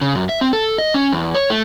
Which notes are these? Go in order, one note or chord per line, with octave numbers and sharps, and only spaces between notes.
C#3
F#2
E5
C4
A4
D#5
C#4
E2
C#5
A3